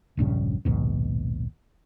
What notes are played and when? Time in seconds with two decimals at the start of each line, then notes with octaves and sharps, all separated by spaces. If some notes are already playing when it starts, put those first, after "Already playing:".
0.17 E1 A#1 G2 C#3
0.65 A#1 D#2 G#2 B2